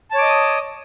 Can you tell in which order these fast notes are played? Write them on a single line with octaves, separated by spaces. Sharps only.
A5 C#5 D6 D#5 D#6